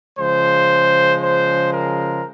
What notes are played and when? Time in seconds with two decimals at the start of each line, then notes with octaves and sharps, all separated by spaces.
0.18 C#3 F3 G#3 C5
1.20 C5
1.71 A#4